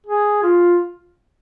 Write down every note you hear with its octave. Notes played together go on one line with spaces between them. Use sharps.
G#4
F4